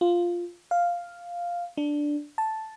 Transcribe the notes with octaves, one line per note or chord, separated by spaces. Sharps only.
F4
F5
D4
A5